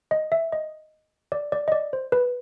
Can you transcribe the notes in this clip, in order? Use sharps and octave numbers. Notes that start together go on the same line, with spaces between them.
D#5
E5
D#5
D5
D5
D#5
D5
C5
B4